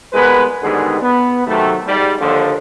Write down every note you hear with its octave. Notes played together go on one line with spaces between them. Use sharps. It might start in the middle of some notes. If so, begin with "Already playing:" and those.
C2 G#3 B3 A#4 B4
G#2 D3 D#3 G3 B3 G#4
B3
C3 D#3 F#3 A3
G#2 G3
D#2 D3 F3